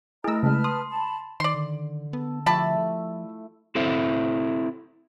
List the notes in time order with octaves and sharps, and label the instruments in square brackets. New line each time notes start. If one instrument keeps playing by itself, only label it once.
[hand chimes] A3 E4 [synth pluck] G#4 E6 [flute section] A#4 D#5 A#5
[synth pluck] C#3 G#3 [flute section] B4 A5 F6
[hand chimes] C6 [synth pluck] D#6
[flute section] A5 B5
[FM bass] D#3 [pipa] D5 C6
[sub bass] D3
[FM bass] B3 [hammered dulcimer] A4
[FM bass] F3 [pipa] G3 A5 B5 [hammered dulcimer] A3 E4 F4
[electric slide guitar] C4 E4 A4 C5 E5